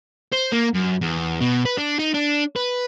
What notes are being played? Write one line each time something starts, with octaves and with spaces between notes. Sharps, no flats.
C5
A#3
F#2
E2
B2
B4
D4
D#4
D4
B4